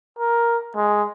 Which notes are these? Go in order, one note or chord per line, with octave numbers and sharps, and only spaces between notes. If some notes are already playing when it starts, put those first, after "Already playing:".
A#4
G#3